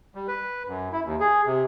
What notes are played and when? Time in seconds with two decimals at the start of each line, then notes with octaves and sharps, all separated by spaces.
0.15 G3
0.28 B4
0.68 F#2
0.92 E4
1.05 D#2
1.20 G#4
1.46 C3